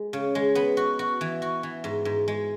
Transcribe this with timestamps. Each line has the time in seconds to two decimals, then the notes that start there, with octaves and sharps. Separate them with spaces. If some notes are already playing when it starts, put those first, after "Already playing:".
Already playing: G#3
0.13 C#3
0.35 G#3
0.55 B3
0.77 F#4
0.99 F#4
1.21 E3
1.42 F#4
1.63 E3
1.84 G#2
2.05 G#2
2.28 G#3